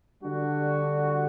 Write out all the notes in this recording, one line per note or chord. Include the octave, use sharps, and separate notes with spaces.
D3 G3 D4 F#4